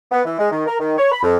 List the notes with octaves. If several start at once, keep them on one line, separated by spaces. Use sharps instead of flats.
B3
E3
G#3
D#3
A#4
D#3
C#5
B5
F2